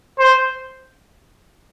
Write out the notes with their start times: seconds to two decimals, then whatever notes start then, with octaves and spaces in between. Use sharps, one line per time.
0.19 C5